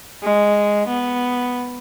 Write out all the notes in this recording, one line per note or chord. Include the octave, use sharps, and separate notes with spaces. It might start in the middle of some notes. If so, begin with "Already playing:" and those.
G#3
B3